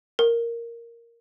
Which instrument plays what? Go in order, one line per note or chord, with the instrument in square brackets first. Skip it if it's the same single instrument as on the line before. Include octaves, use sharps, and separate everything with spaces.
[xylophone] A#4